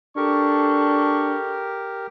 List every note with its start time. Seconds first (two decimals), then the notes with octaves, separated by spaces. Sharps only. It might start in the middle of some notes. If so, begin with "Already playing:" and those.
0.17 D4 G4 A4 A#4 C#6